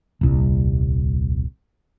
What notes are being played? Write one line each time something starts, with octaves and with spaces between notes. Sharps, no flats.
D#1 C2